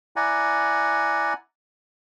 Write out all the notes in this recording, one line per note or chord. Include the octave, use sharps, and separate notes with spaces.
E4 D5 F#5 G#5 A#5